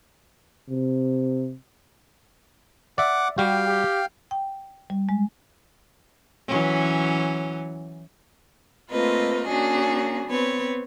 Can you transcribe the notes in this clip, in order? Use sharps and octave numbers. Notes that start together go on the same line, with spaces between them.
C3
D5 E5 F#5 D6
G3 F#4 G4 F5 G5
G4
G5
G3
G#3
E3 F#3 C#4
A3 A#3 C4 F4 B4 D#5
A#3 C#4 D4 F#4 G#4
B3 C4 B4 C#5